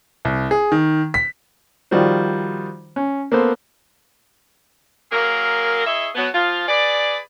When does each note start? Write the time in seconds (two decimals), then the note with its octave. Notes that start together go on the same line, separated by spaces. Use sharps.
0.25 C2
0.51 G#4
0.72 D#3
1.14 B6
1.91 D#3 F3 G3 F4 F#4 C5
2.96 C#4
3.32 A#3 B3 A4 C5
5.12 F#3 A#3 G#4 A#4
5.85 E4 G#4 C#5 D#5 E5
6.15 B2 F#3 B3
6.34 F3 F4
6.68 G#4 B4 D5